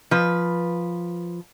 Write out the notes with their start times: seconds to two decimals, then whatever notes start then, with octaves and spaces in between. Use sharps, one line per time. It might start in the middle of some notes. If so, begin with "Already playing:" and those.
0.11 F3 B4